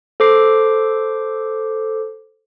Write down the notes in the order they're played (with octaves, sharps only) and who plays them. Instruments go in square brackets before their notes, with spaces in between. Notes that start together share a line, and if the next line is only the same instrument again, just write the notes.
[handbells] A4 C5 D6 C7